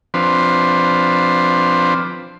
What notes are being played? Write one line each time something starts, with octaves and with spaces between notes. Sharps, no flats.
F3 C4 D4 B4 C5